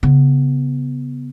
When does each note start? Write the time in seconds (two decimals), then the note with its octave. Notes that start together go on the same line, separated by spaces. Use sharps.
0.03 C#3 B3